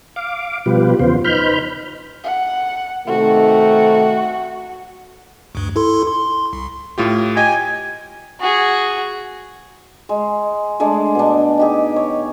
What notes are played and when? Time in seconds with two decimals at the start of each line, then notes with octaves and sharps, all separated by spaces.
0.16 F5 D6
0.66 B2 F3 G3 F4 G4 B4
0.99 E2 C#3 F3 B3 F4 C5
1.25 D#4 B4 C5 B5 F6 G6
2.23 F#5
3.07 C3 D#3 A3 F#4
5.55 D2 G2
5.76 E4 A4 C6
6.07 C6
6.53 C2
6.98 A2 F4 G4
7.37 G4 D#5 G5 G#5
8.40 F#4 G#4
10.09 G#3
10.80 G#3 A3 D4 D#5
11.15 B2 D4
11.58 D#4 G4 G#4
11.96 C#5